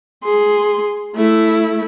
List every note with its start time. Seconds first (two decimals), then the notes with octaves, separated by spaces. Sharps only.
0.24 G#4 C6
1.15 A3 E4